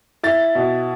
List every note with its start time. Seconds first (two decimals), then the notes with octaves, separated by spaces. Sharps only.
0.23 E4 A6
0.55 B2